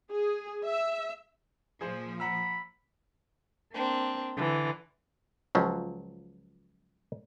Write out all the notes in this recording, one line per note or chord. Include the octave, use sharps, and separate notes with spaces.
G#4
E5
A#2 F3 G#4 C5
F#5 A#5 B5 E6
A#3 C4 D4
D3 E3
C#2 F3 F#3